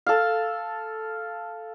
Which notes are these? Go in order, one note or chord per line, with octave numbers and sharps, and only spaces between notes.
A4 F5